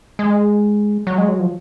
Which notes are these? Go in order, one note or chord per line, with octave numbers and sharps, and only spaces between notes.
G#3
F#3
G#3
F#3
F3